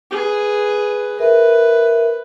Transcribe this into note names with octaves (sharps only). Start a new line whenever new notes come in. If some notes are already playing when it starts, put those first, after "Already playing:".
G#4 B4
A#4 B4 E5